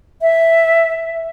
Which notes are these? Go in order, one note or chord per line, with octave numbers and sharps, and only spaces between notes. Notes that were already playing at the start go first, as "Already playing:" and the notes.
E5